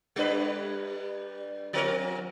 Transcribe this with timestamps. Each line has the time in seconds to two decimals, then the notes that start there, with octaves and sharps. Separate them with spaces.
0.16 G3 D4 B4
1.73 F3 C4 A#4